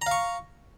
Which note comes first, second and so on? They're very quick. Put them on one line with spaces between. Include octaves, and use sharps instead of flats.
A#5 F5 C#6